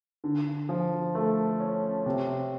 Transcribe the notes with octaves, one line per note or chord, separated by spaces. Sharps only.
D3
F3
A3
C#4
C3